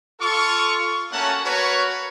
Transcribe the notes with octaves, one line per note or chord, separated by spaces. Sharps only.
F4 A4 C#6
A3 A#3 C#4 F#4 F#5 A5
F#4 A#4 B4 C#5